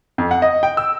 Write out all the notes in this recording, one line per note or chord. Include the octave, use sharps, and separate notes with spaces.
F2
F#5
D#5
G5
E6